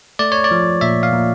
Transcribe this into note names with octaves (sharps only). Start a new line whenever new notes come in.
A3 D5
C#5
D5
F3
A#2 E5
F5
A#2